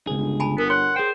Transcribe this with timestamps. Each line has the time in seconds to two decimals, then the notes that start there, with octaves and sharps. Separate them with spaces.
0.07 G#1 C#2 G#4
0.19 G1
0.40 G#5 A5 B5
0.58 B3 A#4
0.70 C#5 F#5 C6
0.96 G#4 C5 G5